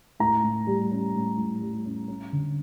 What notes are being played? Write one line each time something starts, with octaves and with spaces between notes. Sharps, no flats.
A2 A#5
A2
G3
C#4
A2
A2
G3
C#4
C#4
D3